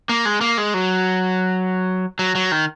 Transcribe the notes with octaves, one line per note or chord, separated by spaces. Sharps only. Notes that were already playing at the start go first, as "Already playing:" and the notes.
A#3
G#3
A#3
G#3
F#3
F#3
F#3
D#3